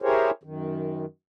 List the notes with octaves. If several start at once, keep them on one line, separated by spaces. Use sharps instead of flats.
E4 G4 G#4 A#4 C5 C#5
F#2 D#3